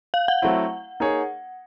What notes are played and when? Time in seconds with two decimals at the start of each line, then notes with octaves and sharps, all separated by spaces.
0.14 F5
0.28 F#5
0.42 F#3 A3 C4 E4
1.00 A#3 D#4 G#4 C#5